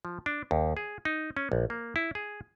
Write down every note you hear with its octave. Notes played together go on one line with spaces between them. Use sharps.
F3
D4
D#2
G#4
D#4
C#4
A#1
A#3
E4
G#4